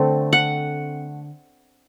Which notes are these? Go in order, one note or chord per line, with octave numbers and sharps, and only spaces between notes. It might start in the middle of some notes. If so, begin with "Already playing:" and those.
Already playing: D3 A3 C4
F#5